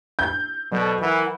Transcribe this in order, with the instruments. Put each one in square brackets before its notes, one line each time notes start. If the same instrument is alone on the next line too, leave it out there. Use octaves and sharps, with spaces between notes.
[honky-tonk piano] G6
[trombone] B2 [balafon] F#3 [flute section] A4 C5 D5
[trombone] E3 [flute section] A#4 F#5 B5